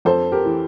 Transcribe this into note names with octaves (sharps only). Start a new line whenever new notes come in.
F2 A4 C5
G4 A#4
E3